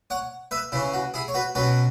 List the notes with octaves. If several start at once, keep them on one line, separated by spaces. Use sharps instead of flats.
C#5 F#5
B4 E5
C#3 E3 C#4 E4
F#4
E4 G#4
C#5
F#4 B4
B2 F#3 C#4 F#4 B4